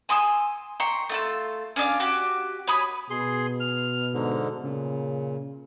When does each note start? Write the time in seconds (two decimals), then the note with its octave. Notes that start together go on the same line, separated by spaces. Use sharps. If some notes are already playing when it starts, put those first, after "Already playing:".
0.09 G#5 C6 D#6 E6
0.80 G5 A#5 C6 C#6
1.09 A3 F4 E6
1.76 C#4 D4 D#5 F5
2.00 F#4 G4
2.67 C#5 G#5 B5 D#6
3.10 B2 G#4 C6
3.60 F6
4.14 G#2 D3
4.63 A#2 C#3